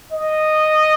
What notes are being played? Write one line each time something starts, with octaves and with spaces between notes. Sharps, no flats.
D#5